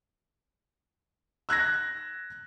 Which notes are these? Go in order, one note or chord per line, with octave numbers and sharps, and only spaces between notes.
E6 F#6 G#6 A#6